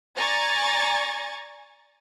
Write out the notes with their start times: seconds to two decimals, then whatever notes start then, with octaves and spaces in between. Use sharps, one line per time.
0.16 D5 G#5 A#5 C#6 G#6 A6